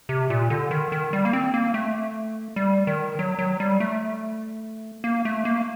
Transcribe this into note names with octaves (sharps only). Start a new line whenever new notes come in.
C3
A#2
D3
D#3
D#3
G3
A#3
C4
A#3
A3
G3
D#3
F#3
F#3
G3
A3
A#3
A3
A#3